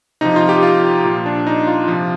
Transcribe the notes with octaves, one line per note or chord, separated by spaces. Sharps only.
C3 F3 D#4
F4
G4
F4
A#2 F3
D4
D#4
F4
C3 F3